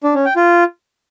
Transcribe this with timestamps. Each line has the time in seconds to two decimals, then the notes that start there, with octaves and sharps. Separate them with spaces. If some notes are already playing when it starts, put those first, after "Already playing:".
0.03 D4
0.14 C#4
0.25 G5
0.36 F4